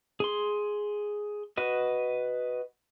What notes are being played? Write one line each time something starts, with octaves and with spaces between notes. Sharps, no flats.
G#4 C6
F#4 B4 D#5